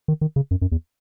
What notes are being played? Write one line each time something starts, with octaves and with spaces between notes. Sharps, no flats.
D#3
D#3
C#3
F#2
F#2
E2